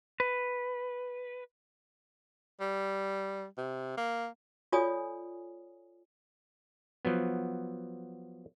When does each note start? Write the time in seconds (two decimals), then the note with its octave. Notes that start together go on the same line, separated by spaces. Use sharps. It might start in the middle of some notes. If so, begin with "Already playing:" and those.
0.20 B4
2.60 G3
3.58 C3
3.97 A#3
4.72 F4 A4 C#5 D5 G#5 D#6
7.05 F3 F#3 B3